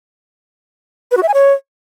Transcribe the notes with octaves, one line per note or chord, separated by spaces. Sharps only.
B4
F#4
E5
G#5
C#5